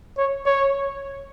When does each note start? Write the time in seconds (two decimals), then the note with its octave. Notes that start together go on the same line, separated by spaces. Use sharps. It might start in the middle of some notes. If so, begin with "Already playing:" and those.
0.18 C#5
0.46 C#5